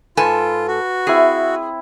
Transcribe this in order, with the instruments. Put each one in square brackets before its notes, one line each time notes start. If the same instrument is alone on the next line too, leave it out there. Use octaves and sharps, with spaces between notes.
[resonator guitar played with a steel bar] G#2 A4 G#5 [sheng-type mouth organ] F4 [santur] B4
[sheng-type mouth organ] F#4
[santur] C4 E4 [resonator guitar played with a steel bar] G#4